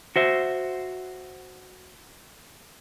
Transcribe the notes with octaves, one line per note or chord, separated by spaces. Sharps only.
F#4 C5 E5